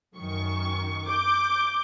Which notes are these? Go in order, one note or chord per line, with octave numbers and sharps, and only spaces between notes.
F#2 D#3 C#6
D6 G6